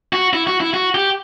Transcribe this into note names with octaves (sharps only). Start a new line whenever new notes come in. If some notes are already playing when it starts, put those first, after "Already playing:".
F#4
E4
F#4
E4
F#4
G4